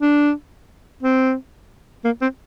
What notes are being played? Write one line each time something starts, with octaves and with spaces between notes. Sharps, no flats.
D4
C4
A#3
C4